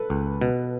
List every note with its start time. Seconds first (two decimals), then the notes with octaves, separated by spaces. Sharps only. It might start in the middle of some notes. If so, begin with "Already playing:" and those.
Already playing: A4 B4
0.10 C#2
0.41 B2